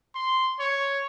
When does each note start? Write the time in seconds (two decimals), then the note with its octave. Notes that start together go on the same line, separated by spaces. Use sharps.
0.15 C6
0.60 C#5